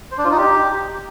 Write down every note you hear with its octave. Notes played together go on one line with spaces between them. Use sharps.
C5
D4
F4
D#4
G4